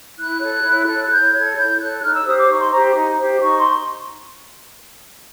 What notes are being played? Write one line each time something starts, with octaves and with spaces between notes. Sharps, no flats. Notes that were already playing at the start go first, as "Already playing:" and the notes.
E4 F#6
A4 C#5
E4
A4 C#5
E4 G6
A4 C#5 G#6
E4 G6
A4 C#5 F#6
D#4 F6
E6
G4 C5 D#6
D6
D#4 C#6
C6
G4 C5 A#5
D#4
G4 C5
D#4 C#6
C6